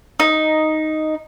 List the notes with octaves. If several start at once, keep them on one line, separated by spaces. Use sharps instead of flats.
D#4